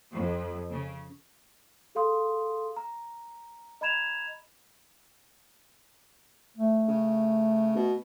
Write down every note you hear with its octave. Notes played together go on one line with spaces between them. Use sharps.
F2
C#3
G#4 A4 F5 C6 D#6
A#5
D#5 A#5 B5 G#6 E7 F7
A3
C#3
B2